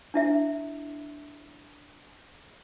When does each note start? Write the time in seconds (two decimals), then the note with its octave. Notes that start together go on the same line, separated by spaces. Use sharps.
0.14 D4 E4 E5